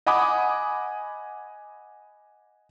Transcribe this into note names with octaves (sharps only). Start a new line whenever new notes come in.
D#5 F#5 G#5 B5 D6 D#6